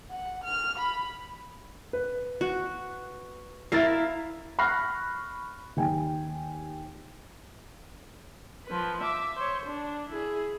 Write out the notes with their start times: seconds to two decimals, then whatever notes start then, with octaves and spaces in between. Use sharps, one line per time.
0.11 F#5
0.44 F6
0.78 B5
1.93 B4
2.41 F#4
3.72 E4 A#4 E5 F5 A6 C7
4.59 B5 C#6 F6 F#6 A#6 C7
5.77 D#2 G4 G5 G#5
8.66 F3 B4
9.01 E5 D6
9.36 C5 C#5
9.65 D4
10.09 E4 G#4